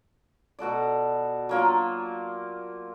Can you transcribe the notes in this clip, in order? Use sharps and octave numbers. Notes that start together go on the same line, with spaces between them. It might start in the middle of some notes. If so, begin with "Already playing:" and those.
B2 F#4 A4 D5
F#3 A#3 F4